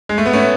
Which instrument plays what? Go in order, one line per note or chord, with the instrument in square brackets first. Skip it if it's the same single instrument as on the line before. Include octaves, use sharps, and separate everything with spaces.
[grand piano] G#3
A3
B3
A3 C#4